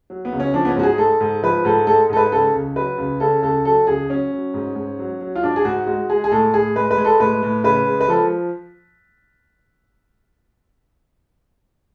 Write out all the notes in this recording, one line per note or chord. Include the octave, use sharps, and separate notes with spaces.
F#3
B3
C#2
C#4
F3 D4
B3
C#4
G#2 F#4
G#4
G#3 A4
G#2
F3 B4
G#2 A4
G#3 A4
G#2 A4
B4
C#3 A4
C#2
F#3 B4
C#2
C#3 A4
C#2 A4
F#3 A4
C#2 G#4
F#3 C#4
F#3
G#2
G#2
F#3
F#3
F4
G#2 D4
G#4
G#2 F#4
G#3 F#4
G#3 G#4
G#4
A2 A4
A2 G#4
G#3 B4
B4
G#3
A4
A2 B4
A2
C#3 B4
G#3
B4
F3 A4